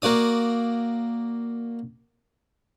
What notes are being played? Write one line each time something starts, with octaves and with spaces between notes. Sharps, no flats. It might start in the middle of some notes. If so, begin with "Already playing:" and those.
A#3 F#4 D5 D#6